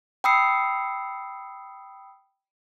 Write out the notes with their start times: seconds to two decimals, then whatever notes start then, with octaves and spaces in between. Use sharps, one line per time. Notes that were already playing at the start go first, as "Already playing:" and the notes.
0.24 G5 B5 D#6 E6 C7 C#7